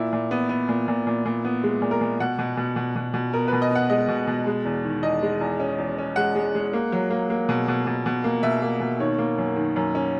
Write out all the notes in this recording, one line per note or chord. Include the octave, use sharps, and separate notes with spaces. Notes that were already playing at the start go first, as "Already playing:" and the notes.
Already playing: A#2 E4
A#2
B3
B3
A#2
A#2
A#2
A#2
B3
G#3
A#2
A#4
A#2
B2 F#5
B2
B2
B2
B2
B2
B3 A#4
B4
B2
D#5
B3 F#5
G#3 D#5
B2
B2
G#3
E2
D#3
E2 D#5
G#3
E2
C#4
E2
C#4
G#3 F#5
G#3
G#3
A#3
F#3
A#3
A#3
B2
B2
B2
B2
A#3
B2 E5
A#3
B2
D#3 C#5
A#3
F#2
D#3
F#2
C#4